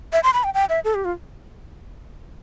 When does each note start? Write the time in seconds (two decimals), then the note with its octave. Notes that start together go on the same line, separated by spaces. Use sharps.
0.13 E5
0.23 C6
0.33 B5
0.44 G5
0.54 G5
0.69 E5
0.85 A4
0.95 G4
1.05 F4